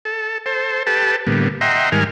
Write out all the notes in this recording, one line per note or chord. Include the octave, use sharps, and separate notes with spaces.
A4
A4 C5
G4 A4 B4 A5
A2 D3 G3 A#3 B3
D#5 E5 F#5 G5 A#5 C6
G#2 D#3 G3 A#4 G#5 F6